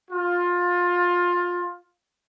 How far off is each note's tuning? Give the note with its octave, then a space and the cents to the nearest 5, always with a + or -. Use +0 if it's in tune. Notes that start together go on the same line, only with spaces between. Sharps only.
F4 +20